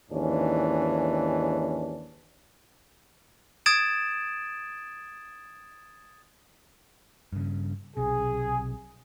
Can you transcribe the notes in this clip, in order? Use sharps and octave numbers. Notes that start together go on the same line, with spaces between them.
D#2 G#2 E3 C#4 D4
D#6 G#6 A6 D7 E7
G2 C#3
B1 C3 G#4